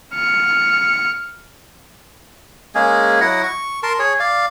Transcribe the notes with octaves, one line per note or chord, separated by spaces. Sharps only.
F6 C#7
G#3 A#3 C#4 G#4
F#3 E4 D#5 F#5
C#6
A#4 A5 C6
G#4 C#5
D5 F5